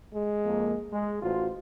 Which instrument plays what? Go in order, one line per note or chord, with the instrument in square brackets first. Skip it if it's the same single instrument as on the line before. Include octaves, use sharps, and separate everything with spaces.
[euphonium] G#3
[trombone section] F2 A#3
G#3
[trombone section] A1 F4 C5 [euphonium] F#4